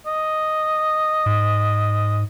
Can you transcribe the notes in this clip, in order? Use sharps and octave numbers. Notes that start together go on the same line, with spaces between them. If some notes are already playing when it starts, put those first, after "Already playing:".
D#5
G#2